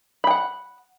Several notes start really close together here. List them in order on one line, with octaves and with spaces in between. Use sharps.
B5 G5 F#5